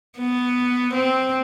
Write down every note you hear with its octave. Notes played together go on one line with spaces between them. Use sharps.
B3
C4